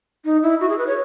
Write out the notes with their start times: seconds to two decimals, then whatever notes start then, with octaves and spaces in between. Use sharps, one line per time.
0.25 D#4
0.43 E4
0.60 F#4
0.69 G#4
0.78 B4
0.87 C#5